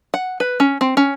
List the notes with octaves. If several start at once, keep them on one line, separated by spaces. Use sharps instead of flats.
F#5
B4
C#4
C4
C#4